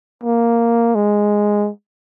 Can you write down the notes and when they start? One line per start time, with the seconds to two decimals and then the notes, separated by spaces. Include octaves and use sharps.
0.23 A#3
0.95 G#3